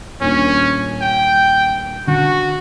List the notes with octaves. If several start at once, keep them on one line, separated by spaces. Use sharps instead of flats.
D#1 A#2 C#4 D4
G5
D3 F#4